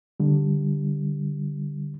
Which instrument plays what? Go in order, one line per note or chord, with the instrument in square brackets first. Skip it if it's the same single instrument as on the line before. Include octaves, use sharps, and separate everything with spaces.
[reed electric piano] D3 G3